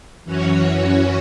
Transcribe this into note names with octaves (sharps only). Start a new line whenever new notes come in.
F#2 E3 C#4 F#4 C#5